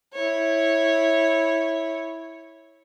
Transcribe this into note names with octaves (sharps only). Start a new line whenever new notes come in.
E4 C#5